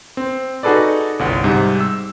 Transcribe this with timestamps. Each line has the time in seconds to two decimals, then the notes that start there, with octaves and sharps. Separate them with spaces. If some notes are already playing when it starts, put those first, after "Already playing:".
0.17 C4
0.63 D#4 F#4 G#4 A4 B4 D5
1.19 G1 C2 F#5
1.44 G#2 C3 G3
1.80 E6